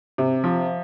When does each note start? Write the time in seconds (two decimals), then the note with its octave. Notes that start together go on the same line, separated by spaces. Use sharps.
0.18 C3
0.44 F3